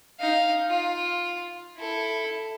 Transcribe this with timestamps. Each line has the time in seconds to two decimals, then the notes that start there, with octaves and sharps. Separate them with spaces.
0.20 D#4 F5
0.67 F4
1.77 E4 A4